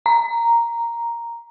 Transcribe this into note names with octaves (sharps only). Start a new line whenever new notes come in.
A#5